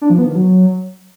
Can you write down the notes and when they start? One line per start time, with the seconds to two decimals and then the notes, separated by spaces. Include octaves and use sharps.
0.02 D4
0.10 F3
0.18 B3
0.27 D#3
0.35 F#3